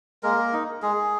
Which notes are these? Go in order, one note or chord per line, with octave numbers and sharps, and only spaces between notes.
G#3 A#3 A#4
D#4
G#3 G#4